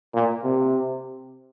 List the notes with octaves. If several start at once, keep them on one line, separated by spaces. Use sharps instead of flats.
A#2
C3